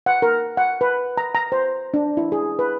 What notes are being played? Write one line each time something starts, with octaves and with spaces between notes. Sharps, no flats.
F#5
A#4
F#5
B4
A#5
A#5
C5
D4
E4
G#4
B4